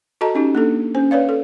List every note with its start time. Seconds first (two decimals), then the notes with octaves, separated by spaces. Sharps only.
0.21 F#4 A4 D#5 A5 A#5
0.35 C#4 D#4 G4
0.55 A#3 D4 A4
0.95 C#4 C5
1.11 B4 C#5 D5 F5
1.29 A4